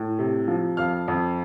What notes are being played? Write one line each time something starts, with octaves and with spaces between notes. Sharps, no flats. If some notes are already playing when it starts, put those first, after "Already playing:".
Already playing: A2
C3
F3
F2 F5 F6
F2